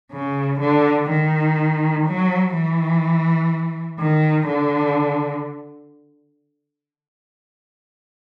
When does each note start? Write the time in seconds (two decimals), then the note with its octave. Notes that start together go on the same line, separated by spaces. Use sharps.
0.12 C#3
0.60 D3
1.09 D#3
2.06 F#3
2.54 E3
4.00 D#3
4.47 D3